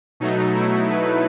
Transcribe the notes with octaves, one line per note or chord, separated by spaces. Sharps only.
B2 F#3 A3 D#4
E4
B4